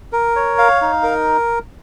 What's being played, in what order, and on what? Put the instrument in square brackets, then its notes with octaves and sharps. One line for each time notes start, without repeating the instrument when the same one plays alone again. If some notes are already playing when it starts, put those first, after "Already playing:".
[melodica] A#4
C#5
F5
D#4
A#4